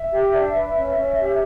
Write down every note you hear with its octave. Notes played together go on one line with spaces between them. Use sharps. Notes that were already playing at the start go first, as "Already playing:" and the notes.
Already playing: E5
G4
D4
B4
C#4
C#4
G4